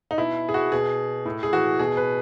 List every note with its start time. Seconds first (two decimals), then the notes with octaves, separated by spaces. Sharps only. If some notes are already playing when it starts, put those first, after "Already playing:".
0.11 D#4
0.18 B2 E4
0.49 G#4
0.54 F#4
0.72 B2 G#4
1.25 A2
1.43 G#4
1.53 E3 F#4
1.79 B2 G#4
1.97 B4